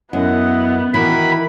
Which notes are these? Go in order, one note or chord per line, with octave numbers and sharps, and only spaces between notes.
F#2 B3 E4 D#5 F#5
D#3 E3 F#4 A#4 B5